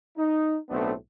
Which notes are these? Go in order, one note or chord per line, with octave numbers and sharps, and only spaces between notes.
D#4
B1 A2 A3 B3 C4 D4